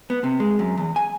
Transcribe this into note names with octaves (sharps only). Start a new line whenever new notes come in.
B3
C3
G#3
F#2
E2
G#5